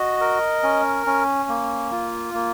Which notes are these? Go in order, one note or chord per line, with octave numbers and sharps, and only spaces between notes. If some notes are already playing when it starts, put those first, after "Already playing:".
Already playing: F#4 D#5
A#4
C#4
C#4
A#3
F4
A#3